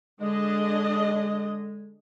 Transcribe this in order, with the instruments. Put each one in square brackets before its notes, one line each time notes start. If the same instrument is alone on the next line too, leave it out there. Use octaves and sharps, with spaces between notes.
[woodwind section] D3 G#3 [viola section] D4 G#4 D#5